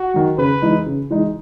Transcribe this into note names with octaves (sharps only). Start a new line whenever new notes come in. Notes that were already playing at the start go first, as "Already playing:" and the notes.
Already playing: F#4
D#3 F#3
C#3 B4
E3 G#3 D#4
C#3
E3 G#3 D#4